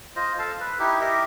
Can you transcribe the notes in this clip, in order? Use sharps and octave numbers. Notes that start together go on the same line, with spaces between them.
F4 C5 D#5
A4 F5 A5
B4
D#4 E4 G4
G4 A#4 D#5 E5